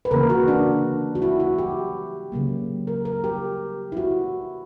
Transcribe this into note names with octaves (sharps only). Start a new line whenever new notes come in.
B4
C#3 E3 A#3 A#4
F#4
D4
F#4
E4
F#4
G4
C#3 F#3 A#3
A#4
A#4
G4
E4
F#4